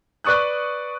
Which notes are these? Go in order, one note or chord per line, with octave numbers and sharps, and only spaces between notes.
B4 D5 C#6 D#6 F#6